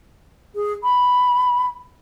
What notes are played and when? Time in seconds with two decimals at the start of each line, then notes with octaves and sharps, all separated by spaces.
0.55 G#4
0.84 B5